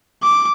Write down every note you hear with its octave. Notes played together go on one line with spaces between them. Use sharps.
D6